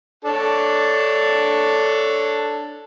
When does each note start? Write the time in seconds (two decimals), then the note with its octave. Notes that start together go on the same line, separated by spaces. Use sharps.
0.25 D4 A4 C#5